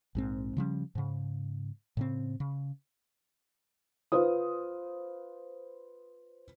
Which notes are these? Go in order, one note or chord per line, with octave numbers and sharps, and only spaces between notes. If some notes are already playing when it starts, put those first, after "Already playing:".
A#1 G#2 C4
C#3 F3 G3 C#4
G#2 C#3
A2 C#3 C4
C#3
F4 B4 C5 D#6